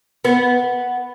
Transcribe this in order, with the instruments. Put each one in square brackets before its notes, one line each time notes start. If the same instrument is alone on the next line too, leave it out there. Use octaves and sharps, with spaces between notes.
[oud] B3